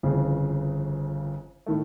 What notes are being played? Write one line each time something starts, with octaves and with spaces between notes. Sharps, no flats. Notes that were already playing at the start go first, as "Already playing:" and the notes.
G1 F2 C#3 E3
A2 D#3 A3